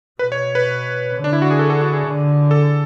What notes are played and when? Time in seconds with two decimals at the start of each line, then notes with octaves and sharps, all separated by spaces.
0.19 B2 B4
0.32 C#5
0.55 B4
1.12 D3
1.24 D4
1.33 E4
1.42 F#4
1.50 G#4
1.59 A4
1.70 A4
1.82 F#4
1.93 G#4
2.05 D3
2.51 A4